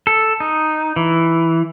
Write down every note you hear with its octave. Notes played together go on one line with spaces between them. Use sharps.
A4
D#4
E3